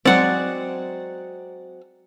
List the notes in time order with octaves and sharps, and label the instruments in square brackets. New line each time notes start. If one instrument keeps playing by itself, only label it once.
[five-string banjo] F#3 G#3 C4 [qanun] D5 F#5